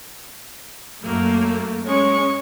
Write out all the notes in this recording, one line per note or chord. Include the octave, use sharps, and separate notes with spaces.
F#2 A3 A#3
G#3 C#4 C#6